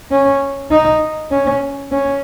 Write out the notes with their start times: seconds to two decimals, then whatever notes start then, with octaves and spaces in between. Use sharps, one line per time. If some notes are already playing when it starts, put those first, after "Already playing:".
0.11 C#4
0.71 D#4
1.31 C#4
1.91 C#4